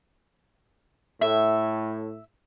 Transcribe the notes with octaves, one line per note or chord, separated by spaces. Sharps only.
A2 E5